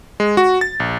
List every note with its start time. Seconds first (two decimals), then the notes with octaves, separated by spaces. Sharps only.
0.20 G#3
0.37 F#4
0.61 A6
0.80 A#1